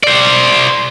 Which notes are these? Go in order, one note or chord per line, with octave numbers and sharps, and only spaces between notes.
C5 D5